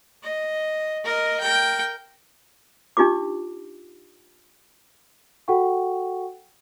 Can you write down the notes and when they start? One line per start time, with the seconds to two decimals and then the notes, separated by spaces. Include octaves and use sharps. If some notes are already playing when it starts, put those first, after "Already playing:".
0.24 D#5
1.04 A#4 D#5
1.40 A#4 G5
2.97 D4 D#4 F4 G4 D6
5.48 F#4 A4 F#5 G5 C#6